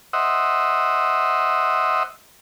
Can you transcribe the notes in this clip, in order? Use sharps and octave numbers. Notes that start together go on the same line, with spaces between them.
C5 D#5 E5 F#5